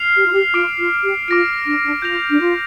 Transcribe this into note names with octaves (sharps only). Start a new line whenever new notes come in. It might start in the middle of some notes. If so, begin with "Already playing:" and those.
Already playing: F6 C7 F7
G4
F4
G4
F4 D6 F6 D7 F7
F4
G4
F4 D6 A#6 D7
D4
D4
F4 G6 A#6 F7
D4
F4